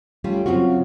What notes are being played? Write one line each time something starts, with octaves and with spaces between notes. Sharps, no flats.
G3 A3 C#4 F4
F#2 C#3 C4 F4 F#4